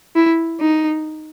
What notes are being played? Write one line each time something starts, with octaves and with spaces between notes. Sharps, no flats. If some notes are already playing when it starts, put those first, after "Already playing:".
E4
D#4